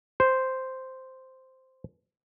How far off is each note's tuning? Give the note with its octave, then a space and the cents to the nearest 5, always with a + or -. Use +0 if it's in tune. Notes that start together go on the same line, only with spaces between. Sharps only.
C5 -5